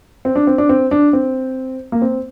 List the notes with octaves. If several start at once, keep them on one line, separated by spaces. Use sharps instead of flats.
C4
D4
C4
D4
C4
D4
C4
A#3
C4